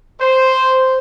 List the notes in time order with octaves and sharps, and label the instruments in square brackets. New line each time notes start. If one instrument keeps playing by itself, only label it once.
[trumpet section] C5